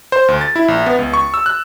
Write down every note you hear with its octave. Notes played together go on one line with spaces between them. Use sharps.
C5
D2
A6
E4
A#1
B3
C#2
C#6
E6
F#6